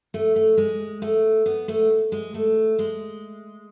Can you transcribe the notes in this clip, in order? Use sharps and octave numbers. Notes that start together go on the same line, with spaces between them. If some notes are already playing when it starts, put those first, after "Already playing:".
A3
A3
G#3
A3
B3
A3
G#3
A3
G#3